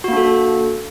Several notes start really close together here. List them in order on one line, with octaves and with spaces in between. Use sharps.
F#4 A#3 D4 A4